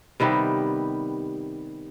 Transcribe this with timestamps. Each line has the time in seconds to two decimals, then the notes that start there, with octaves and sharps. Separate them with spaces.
0.20 C3 D#3 G3 B3